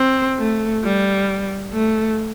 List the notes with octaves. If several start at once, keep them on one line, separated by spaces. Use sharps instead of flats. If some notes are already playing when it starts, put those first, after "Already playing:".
Already playing: C4
A3
G3
A3